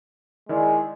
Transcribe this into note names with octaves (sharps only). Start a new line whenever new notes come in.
D#3 G#3 E4 D5